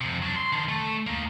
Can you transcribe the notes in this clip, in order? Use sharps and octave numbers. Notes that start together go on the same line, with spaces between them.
F2 C3
F#3 D4
C6
D3 D#3
A3
A#3 D#4